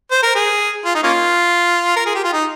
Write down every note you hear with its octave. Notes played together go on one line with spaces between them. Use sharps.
C5
A#4
G#4
F4
D#4
A#3 C#4 F4
A#4
G#4
G4
F4
D#4